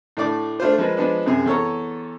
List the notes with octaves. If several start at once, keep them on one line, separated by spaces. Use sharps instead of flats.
A2 D3 A3 D5 D6
A3 D4 F4 C5
F3 G#3 A#4 B4
F3 G#3 B3 D4
F#2 C3 G#4
E2 A4 C#5 A#5